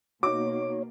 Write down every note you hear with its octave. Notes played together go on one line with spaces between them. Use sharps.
B2 A#3 D#4 F#4 C#5 D6